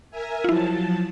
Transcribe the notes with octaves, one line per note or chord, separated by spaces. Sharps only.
A#4 E5 G#5
F3 F#3 E4 F4 A5